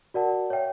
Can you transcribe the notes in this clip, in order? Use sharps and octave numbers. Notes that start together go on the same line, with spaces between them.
F#4 A#4 D5 F#5 A5
C#5 E5 G5